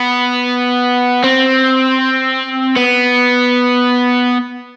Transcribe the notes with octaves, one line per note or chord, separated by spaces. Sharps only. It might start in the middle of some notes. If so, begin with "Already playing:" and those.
Already playing: B3
C4
B3